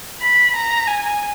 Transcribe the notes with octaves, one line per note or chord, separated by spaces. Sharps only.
B5
A#5
G#5